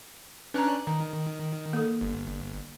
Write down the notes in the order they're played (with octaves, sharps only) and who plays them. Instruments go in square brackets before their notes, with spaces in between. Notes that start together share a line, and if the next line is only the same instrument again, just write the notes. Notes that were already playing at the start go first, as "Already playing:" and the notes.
[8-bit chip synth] C#4 D4 F#6 [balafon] B4 A#5
[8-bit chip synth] D#3 [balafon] A#5
[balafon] A#3 A4
[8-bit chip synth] G1